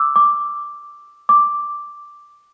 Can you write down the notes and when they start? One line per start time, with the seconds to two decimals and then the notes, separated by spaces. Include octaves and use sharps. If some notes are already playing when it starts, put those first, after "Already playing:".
Already playing: D6 E6
0.16 D6
1.29 D6